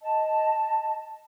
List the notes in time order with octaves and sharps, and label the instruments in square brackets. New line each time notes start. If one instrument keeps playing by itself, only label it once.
[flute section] D#5 A5